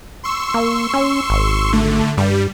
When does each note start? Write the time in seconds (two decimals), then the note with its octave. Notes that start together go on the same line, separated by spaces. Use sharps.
0.24 C6 C#6 E6
0.54 A#3
0.94 C#4
1.30 G#1
1.72 D3 A3
2.17 G2 G3